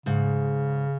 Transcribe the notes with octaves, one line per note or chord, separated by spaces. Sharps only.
G#2 C#3